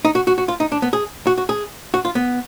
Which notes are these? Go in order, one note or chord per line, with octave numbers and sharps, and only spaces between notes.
D#4
F#4
F#4
F#4
F4
D#4
D4
B3
G#4
F#4
F#4
G#4
F#4
F4
B3